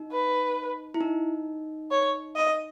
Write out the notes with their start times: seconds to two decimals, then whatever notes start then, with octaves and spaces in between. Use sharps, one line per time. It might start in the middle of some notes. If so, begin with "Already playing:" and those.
Already playing: D#4
0.12 B4
0.94 E4
1.01 D#4
1.91 C#5
2.36 D#5